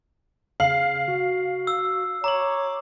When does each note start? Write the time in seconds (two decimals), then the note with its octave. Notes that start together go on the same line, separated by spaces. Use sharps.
0.60 C#3 F5 C7 F#7
1.08 F#4
1.67 E6
2.24 C#5 A#5 D6 F#7